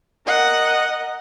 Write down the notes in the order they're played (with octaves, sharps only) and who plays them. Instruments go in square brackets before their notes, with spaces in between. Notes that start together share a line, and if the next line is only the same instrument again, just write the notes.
[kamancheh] A#4 D#5 [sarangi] F#5